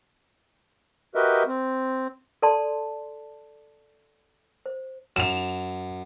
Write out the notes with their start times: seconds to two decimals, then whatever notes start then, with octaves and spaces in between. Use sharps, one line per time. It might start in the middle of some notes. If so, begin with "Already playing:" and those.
1.15 F#4 G4 A#4 B4 D#5 E5
1.47 C4
2.42 A4 D5 A5 C6
4.66 C5
5.16 F#2 E7 F7